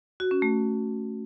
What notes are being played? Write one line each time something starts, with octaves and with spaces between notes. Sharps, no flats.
F#4
C#4
A3